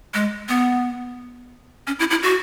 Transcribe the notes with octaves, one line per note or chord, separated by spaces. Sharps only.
G#3
B3
C#4
E4
E4
F#4